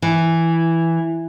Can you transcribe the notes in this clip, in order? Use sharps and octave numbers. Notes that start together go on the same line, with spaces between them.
E3